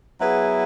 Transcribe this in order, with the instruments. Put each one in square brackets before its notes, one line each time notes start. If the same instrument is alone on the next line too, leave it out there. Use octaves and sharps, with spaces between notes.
[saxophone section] F#3 B3 E4 G#4 B4